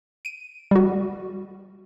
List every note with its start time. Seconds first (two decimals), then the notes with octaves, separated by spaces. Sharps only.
0.25 D7 D#7
0.71 G3 F#4